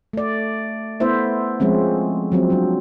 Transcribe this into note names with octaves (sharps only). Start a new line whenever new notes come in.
A3 D5
A3 B3 E4 C5 E5
F3 G#3 C4 C#4
F3 F#3 C4
F#3 D4